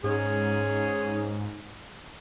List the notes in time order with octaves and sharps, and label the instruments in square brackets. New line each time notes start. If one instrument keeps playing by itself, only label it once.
[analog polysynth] G#2 [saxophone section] C#4 G#4